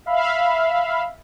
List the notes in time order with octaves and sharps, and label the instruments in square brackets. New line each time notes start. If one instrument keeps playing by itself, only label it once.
[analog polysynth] E5 F5 B5